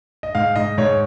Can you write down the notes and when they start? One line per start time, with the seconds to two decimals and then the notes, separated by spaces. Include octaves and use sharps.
0.23 D#5
0.35 G#2 F5
0.56 G#2 D#5
0.78 G#2 C#5